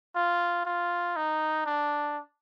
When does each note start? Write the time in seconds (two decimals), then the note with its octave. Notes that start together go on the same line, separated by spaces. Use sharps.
0.15 F4
0.65 F4
1.16 D#4
1.66 D4